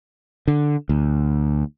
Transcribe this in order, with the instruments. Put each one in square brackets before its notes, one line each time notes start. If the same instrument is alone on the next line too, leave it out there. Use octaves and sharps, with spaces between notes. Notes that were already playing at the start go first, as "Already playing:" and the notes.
[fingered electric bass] D3
D2